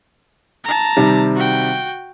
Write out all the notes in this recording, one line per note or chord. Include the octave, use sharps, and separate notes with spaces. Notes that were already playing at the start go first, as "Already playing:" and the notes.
A5 A#5
C3 D#3 G3
F#4 G5